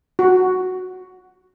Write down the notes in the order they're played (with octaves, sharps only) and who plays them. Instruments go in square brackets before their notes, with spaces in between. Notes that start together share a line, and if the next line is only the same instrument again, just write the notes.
[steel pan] F#4